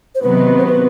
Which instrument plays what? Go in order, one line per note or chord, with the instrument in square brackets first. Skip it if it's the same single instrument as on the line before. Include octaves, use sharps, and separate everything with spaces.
[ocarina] C5
[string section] C3 D#3 F#3 B3 [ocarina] B4
[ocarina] C5
B4